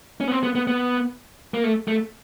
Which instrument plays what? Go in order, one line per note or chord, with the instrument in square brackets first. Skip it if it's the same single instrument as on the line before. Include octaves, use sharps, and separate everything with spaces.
[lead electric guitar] C#4
B3
C4
B3
B3
B3
A#3
A3
A3